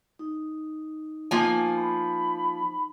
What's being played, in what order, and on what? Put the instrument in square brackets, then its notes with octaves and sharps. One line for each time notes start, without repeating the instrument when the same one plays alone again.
[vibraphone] D#4
[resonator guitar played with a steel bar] F3 A#3 G#5
[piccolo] B5